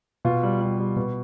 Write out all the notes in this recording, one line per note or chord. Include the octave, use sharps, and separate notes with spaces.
B2 F4
G3
G3
G3
B2